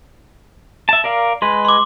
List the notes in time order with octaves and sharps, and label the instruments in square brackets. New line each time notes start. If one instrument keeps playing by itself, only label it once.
[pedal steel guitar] E5 A5
A#4 D5 F5
[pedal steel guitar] G#3 B4 [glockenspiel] C6
[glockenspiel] C6 D6